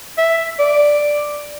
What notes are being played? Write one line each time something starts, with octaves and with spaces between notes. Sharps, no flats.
E5
D5